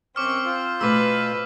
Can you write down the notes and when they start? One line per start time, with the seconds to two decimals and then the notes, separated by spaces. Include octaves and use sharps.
0.16 F#2 C4 C#6 D6 F6
0.45 F4 C5
0.81 B2 A3 G#4 B4 D6 E6